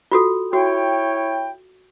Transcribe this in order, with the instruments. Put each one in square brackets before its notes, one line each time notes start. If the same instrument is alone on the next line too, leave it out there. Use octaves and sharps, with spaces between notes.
[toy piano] F4 F#4 A4
[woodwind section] E4 C#5 G5 [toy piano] F#4